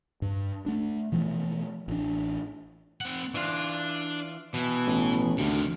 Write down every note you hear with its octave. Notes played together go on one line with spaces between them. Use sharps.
G2
A3 D4
B2 E3 F3 A3
A1 D4
C4 F#5
E3 D4 F4
B2 E3
A1
D2 C3 D#3